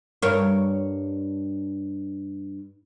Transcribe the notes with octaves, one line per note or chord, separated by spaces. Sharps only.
G2 A#4 C#5